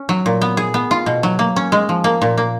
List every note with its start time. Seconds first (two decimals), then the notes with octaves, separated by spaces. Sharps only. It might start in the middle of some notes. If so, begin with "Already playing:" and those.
Already playing: C#4
0.09 F#3
0.26 A#2
0.42 B3
0.57 G#4
0.74 B3
0.91 F4
1.06 B2
1.23 F#3
1.39 A#3
1.56 C#4
1.72 G#3
1.89 F3
2.04 A#3
2.22 A#2
2.37 A#3